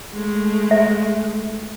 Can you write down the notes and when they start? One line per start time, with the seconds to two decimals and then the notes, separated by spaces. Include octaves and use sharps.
0.13 G#3 A3
0.71 E5